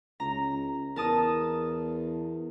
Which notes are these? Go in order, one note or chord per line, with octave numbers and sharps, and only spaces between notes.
C#2 A#5
E2 A#4 A5 D#6